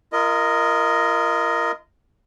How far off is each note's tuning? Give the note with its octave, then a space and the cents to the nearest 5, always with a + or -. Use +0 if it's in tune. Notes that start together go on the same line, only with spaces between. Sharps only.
F4 -40 A#4 +0 D#5 +0